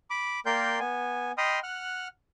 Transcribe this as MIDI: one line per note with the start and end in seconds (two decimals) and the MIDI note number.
0.10 0.40 83
0.10 0.40 86
0.46 0.79 58
0.46 0.79 70
0.46 0.79 74
0.46 0.79 79
0.46 0.79 84
0.46 0.79 91
0.80 1.32 59
0.80 1.32 80
1.38 1.60 75
1.38 1.60 79
1.38 1.60 83
1.38 1.60 84
1.38 1.60 87
1.38 1.60 89
1.63 2.08 78
1.63 2.08 89
1.63 2.08 90